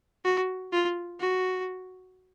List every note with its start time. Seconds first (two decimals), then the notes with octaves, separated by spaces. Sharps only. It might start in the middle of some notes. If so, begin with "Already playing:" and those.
0.25 F#4
0.72 F4
1.20 F#4